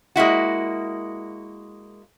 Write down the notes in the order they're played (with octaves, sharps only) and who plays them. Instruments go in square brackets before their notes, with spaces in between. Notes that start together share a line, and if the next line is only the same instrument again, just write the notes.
[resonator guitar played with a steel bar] G#3 A#3 E4 F#4